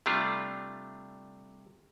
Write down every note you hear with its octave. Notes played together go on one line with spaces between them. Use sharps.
C3 G3 A3 D4 F4